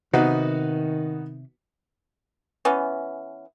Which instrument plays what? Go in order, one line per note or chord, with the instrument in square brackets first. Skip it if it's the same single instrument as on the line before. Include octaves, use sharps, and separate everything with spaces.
[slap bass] C3 [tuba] D#3 [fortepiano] B3 D#4 F#4
[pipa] E3 B3 C#4